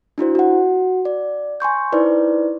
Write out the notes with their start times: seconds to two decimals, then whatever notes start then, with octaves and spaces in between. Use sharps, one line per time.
0.18 D4 E4 F#4 C5
0.35 F#4 F#5
1.05 D5
1.60 G#5 C6 C#6 G6
1.92 D#4 E4 B4 C5 D5